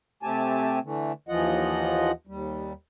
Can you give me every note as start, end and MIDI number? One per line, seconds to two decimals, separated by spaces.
0.23 0.79 48
0.23 0.79 57
0.23 0.79 60
0.23 0.79 67
0.23 0.79 80
0.23 0.79 81
0.84 1.12 50
0.84 1.12 52
0.84 1.12 57
1.29 2.11 39
1.29 2.11 52
1.29 2.11 53
1.29 2.11 65
1.29 2.11 75
1.29 2.11 78
2.27 2.73 39
2.27 2.73 55